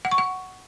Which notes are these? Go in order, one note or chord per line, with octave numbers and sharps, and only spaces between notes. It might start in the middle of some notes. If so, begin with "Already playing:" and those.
F#5
C#6
F#5